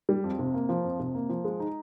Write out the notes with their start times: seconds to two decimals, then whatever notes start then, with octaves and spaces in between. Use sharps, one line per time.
0.09 G3
0.24 F2
0.39 C3
0.54 A#3
0.69 F3
0.84 F2
0.99 C3
1.15 A#3
1.29 F3
1.45 G#3
1.60 D#4